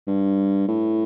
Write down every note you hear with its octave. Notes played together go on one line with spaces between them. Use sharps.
G2
A2